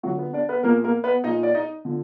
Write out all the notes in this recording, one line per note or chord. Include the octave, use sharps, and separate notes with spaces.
D3 F3 F#3 F#4
B3 B4
D4 D5
B3 B4
A#2 F3 A#3 A#4
A#3 A#4
B3 B4
A#2 F3 D#4 D#5
D5
D#4 D#5
D3 F3